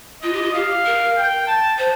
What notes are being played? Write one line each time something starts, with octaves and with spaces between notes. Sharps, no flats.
F4 D#5
G4
F4
G4 F5
A#4
G5
A5
C5